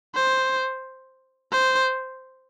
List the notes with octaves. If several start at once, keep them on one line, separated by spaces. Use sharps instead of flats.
C5
C5